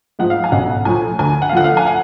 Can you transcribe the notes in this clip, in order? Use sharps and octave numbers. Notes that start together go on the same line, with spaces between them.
G#2 F3 F#5
F5
G#5
B1 F#5
A2 F3 G#5
D2 G#5
F#5
F5
D3 F3 F#5
F5
G#5
F#5